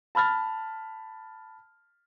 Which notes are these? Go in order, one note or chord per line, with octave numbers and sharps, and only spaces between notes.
A5 B5 F6 A6